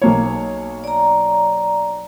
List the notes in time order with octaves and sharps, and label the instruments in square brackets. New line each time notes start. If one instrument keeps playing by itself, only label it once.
[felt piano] B1 A#3 C#5
[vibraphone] D5 A#5